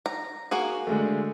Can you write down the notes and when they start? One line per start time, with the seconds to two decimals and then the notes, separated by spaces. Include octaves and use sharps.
0.06 A#5
0.51 A#3 F#4 G#4
0.87 D3 G#3 A3